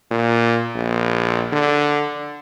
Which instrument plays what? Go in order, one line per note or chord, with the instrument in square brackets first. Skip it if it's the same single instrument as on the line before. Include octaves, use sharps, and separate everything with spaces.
[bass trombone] A#2
A#1
D3